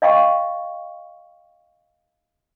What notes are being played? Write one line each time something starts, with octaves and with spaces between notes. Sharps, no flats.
D#5 F5 G5 C#6